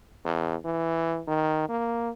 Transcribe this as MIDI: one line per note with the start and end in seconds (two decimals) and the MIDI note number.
0.25 0.55 40
0.65 1.22 52
1.27 1.66 51
1.69 2.10 58